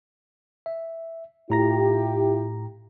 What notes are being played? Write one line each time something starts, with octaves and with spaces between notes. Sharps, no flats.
E5
A2 E4 F4 G4 A#5 A#6